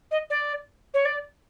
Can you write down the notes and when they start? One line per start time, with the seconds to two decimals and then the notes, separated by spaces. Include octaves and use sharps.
0.11 D#5
0.30 D5
0.94 C#5
1.05 D5